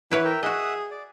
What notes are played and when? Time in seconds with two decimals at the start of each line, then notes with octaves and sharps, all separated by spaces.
0.11 E3 E4 B4 C#5 F#5 B5
0.25 A#4 E5 G5
0.43 F#4 G#4 D#5 E5 F#5 D#6
0.91 D5